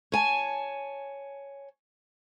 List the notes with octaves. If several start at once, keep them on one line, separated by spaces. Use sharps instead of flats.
C#5 G#5 A5